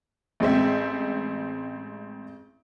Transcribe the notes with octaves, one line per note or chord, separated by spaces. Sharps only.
A1 G#3 C4 E5